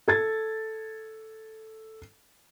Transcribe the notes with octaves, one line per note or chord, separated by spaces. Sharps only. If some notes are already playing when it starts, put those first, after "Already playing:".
A4 G#6 A6